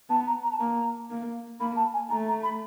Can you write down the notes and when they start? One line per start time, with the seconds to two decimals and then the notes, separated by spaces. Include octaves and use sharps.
0.09 B3 A5
0.27 A#5
0.43 A#5
0.52 A5
0.59 A#3 A#5
1.10 A#3
1.60 A#3 B5
1.76 A5
1.94 G#5
2.10 A3 A#5
2.28 A#5
2.43 B5